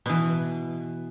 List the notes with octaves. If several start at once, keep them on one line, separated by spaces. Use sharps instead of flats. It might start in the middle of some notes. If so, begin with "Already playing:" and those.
B2 E3